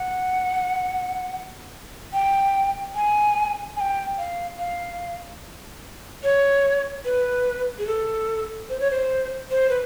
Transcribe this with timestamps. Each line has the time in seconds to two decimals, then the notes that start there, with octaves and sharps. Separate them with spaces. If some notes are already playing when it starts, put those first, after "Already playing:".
Already playing: F#5
2.13 G5
2.95 G#5
3.76 G#5
3.80 G5
4.18 F5
4.59 F5
6.23 C#5
7.05 B4
7.78 G#4
7.87 A4
8.70 C5
8.80 C#5
8.91 C5
9.51 C5
9.70 B4